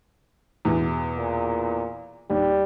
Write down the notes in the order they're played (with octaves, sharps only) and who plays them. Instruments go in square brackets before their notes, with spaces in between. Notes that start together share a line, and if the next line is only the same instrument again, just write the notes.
[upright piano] E2 B2 E3
[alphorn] A#2
[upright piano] D#2 [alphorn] G3